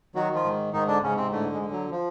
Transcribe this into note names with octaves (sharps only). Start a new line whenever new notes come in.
D#3 F#3 F#4
F3 F4
G#2
G#2 D#3 D#4
D3 D4
G#2 C#3 C#4
C3 C4
A2 D3 A3
G#2 G#3
D3
F#3
F3